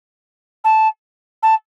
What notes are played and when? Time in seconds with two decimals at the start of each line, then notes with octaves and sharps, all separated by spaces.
0.64 A5
1.43 A5